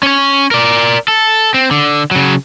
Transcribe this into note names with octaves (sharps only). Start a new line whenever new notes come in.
C#4 C#5
A#4 D5
A4
C4
D3
C#3 F#3